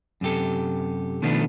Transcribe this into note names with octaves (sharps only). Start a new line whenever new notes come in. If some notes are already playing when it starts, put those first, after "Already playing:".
F#2 C3 G4 A4
B2 D#3 F3 A3 B3 D4